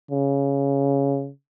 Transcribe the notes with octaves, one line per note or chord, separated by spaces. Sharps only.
C#3